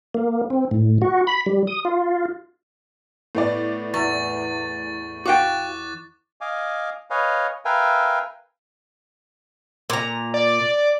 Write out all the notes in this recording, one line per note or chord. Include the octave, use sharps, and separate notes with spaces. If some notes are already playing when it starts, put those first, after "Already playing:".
A#3
C4
A2
F#4
B5
G3
D#6
F4
A2 B3 D5
E2 C#6 A6
F#4 F5 G5 D6 F#6 A6
D#5 F5 G#5 D6
B4 C#5 D#5 F5 G#5
A#4 B4 E5 F5 G5 G#5
A#2 A#5
D5